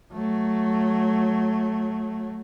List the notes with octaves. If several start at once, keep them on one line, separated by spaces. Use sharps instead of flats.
F#3 A3